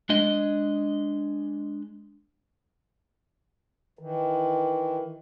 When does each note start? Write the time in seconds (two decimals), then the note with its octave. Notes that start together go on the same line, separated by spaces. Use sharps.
0.09 G#3 D4 D#5
3.99 D#3 E3